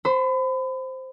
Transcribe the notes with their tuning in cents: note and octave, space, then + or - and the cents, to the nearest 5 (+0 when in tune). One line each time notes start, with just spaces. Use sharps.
C5 +0 B5 +35